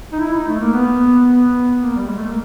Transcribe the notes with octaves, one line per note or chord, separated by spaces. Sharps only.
D#4
E4
D#4
A3
A#3
B3
B3
A#3
G3
G#3
A3
A#3